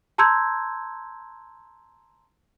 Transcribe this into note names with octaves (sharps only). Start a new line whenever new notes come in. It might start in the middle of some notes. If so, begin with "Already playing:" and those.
A5 A#5 C6 E6 G6 G#6